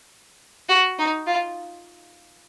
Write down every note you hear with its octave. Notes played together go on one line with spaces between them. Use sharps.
F#4
D#4
F4